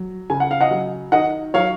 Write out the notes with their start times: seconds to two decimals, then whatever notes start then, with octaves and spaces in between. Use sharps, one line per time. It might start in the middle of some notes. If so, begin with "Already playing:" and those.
Already playing: F#3
0.30 C#3 G#5
0.40 F#5
0.51 F5
0.61 D#5 F#5
0.71 F#3
1.12 D#3 D#5 F#5
1.54 F#3 C#5 F5